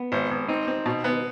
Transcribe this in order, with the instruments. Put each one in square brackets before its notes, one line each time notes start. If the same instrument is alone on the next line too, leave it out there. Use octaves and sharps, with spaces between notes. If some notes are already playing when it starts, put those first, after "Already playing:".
Already playing: [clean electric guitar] B3
[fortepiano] G#1
G#1
[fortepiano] C4 [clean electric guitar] D#4
[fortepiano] C4
B2
B3